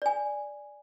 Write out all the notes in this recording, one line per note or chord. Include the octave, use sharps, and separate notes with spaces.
D5 G#5